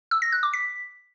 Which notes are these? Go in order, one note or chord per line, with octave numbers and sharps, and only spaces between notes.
E6
A#6
F#6
D6
B6